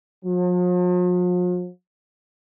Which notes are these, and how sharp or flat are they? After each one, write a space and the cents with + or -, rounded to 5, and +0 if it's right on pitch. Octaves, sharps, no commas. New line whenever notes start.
F3 +45